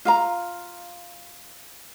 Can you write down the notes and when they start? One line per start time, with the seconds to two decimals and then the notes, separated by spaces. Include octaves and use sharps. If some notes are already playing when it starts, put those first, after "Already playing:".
0.05 F4 F5 A#5